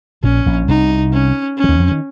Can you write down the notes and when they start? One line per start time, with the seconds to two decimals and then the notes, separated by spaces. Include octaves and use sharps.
0.23 A#1 A#2 C#4
0.46 A#1 A#2
0.68 C2 C3 D#4
1.13 C#4
1.58 C#4
1.64 F3
1.69 D#2 D#3
1.80 F2 F3
1.91 D#3